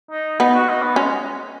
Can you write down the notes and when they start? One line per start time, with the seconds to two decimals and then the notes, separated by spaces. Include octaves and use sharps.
0.11 D#4
0.40 B3 D#4
0.54 F#4
0.69 D#4
0.83 B3
0.96 G#3 C#4